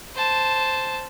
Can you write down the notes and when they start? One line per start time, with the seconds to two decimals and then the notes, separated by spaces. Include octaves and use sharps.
0.15 C5 A5